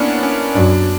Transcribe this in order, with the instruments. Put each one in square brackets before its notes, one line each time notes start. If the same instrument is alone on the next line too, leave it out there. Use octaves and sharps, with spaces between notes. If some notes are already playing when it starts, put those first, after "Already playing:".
Already playing: [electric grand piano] A#3 B3 C#4 D4 E4
C#4
[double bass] F#2 [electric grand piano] D4